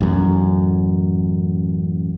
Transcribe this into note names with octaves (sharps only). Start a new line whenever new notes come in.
A1 F#2